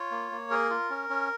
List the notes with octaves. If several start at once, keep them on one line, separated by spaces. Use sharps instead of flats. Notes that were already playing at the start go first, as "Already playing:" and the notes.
Already playing: F4 C#5
A#3
A#3
G#4 A#4
F4
C#4
C#4